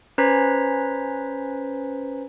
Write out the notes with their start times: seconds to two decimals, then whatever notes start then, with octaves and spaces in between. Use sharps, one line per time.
0.18 C#4 B4 C5 A#5 G#6 B6